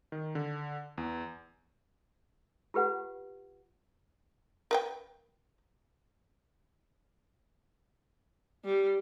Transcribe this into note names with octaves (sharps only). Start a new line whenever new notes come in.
D#3
D3
E2
F4 G4 B4 F#5
A#4 B4 G5
G3